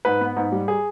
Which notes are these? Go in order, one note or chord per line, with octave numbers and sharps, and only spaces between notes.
G#2 B4
B3
G#2
G3
G#4